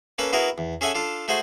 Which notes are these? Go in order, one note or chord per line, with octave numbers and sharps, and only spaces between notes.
A#3 C#4 A4 B4 B5
B3 E4 F#4 G#4 A#4 B4
E2
C#4 G#4 A4 E5 F#5 G#5
D4 F4 A4
A3 F#4 G#4 C5 F#5 G#5